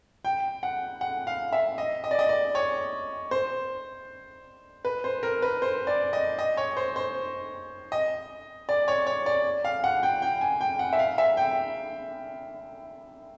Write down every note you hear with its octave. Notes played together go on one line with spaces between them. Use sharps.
G5
F#5
F#5
F5
E5
D#5
D#5
D5
D#5
D5
C#5
C5
B4
C5
A#4
B4
C5
D5
D#5
D#5
C#5
C5
C5
D#5
D5
C#5
C#5
D5
F5
F#5
G5
G5
G#5
G5
F#5
E5
F5
E5
G5